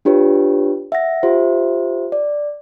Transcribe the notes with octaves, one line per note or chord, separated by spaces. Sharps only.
D4 F4 G4 B4 C#5
E5 F#5 A#6
F4 G4 C5 E5
D5